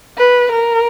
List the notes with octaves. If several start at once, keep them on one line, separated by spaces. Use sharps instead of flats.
B4
A#4